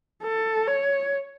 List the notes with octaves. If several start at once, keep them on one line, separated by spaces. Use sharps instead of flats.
A4
C#5